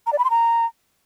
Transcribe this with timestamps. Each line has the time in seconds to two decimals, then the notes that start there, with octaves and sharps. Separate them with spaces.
0.07 A#5
0.13 D5
0.18 B5
0.24 C6
0.30 A#5